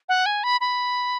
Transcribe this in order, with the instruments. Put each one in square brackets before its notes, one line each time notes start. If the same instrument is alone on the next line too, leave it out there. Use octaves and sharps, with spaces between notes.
[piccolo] F#5
G#5
B5
B5